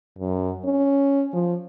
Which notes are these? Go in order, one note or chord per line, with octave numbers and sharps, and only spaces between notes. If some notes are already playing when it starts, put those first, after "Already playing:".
F#2
C#4
F3